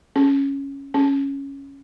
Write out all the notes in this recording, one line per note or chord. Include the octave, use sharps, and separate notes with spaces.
C#4
C#4